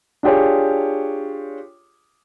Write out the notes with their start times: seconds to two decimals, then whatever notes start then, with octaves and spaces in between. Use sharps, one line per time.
0.23 D4 F4 G4 G#4 C#5